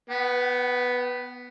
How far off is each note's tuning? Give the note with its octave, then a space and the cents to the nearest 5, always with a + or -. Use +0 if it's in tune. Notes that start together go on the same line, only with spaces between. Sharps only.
B3 +0 G5 -45